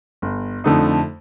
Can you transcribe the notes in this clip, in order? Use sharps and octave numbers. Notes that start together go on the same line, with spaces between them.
G1
F2 D3 A3 D#4